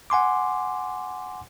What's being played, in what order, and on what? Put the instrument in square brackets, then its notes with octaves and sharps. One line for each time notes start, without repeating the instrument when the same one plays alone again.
[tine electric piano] F#5 G#5 C6 D6